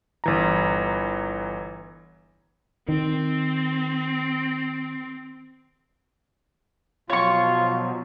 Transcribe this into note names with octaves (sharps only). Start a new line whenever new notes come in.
G1 E3 A#5
D#3 C4
B2 F3 F#3 F4 C#5 C#6